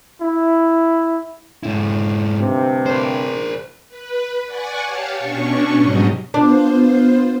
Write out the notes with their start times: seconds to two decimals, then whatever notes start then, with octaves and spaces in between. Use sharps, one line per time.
0.21 E4
1.63 G#2 E4
2.39 D2 G2 C3
2.86 A#4 C5
3.88 B4
4.45 D5 F#5 G#5 C#6
4.83 G4 C#5 F5 A5
5.19 B2 C#4 D4 C#6
5.76 G#2 F#3 G3 D#5
6.34 B3 D4 F4 C5